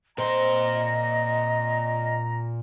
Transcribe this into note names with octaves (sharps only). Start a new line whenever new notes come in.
A#2 C4 D#5 A#5 C6